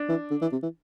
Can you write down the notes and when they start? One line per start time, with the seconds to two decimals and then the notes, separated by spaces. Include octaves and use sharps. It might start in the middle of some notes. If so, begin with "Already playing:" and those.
Already playing: D4
0.09 E3
0.31 D3
0.42 E3
0.52 C3
0.63 E3